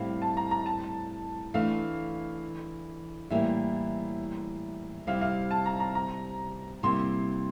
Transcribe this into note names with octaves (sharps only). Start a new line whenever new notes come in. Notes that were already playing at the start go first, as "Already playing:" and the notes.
Already playing: A2 G3 C4 E4 F5
A5
A#5
A#5
A5
E3 A3 D4 F5
A2 E3 G3 A#3 E4 E5
C3 G3 C4 E4 F5
F5
A5
A#5
A#5
A#5
C3 G3 A#3 E4 C6